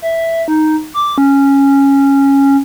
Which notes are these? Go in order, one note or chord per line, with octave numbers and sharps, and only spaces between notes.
E5
D#4
D6
C#4